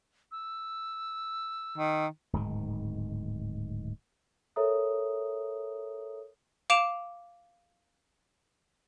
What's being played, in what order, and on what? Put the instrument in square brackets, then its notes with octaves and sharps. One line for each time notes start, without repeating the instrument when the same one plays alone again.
[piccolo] E6
[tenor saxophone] D#3
[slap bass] D1 G#2 D#3
[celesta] A4 A#4 C#5 E5 A#5 D#6
[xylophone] F5 D6 D7 E7 F7